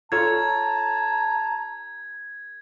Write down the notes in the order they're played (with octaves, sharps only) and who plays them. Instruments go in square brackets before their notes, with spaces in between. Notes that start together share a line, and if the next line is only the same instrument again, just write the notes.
[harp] F4 A4 C#5 [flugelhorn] A5 [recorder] A#5 [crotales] G#6